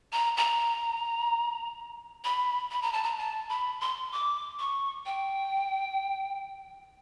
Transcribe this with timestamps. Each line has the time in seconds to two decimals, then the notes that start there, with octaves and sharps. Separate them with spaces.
0.13 A#5
0.37 A#5
2.24 B5
2.71 B5
2.82 A#5
2.93 A5
3.03 A#5
3.18 A5
3.49 B5
3.81 C6
4.12 D6
4.60 C#6
5.06 G5